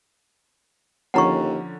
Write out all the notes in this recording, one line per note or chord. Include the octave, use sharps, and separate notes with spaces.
D#2 D3 F3 C#4 F#5 A#5 C#6